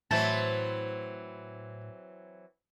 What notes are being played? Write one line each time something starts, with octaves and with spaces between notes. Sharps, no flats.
A2 E3 F#3 C4 E4 C5 A5